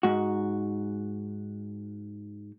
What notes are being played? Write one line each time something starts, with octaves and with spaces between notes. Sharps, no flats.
G#2 F#4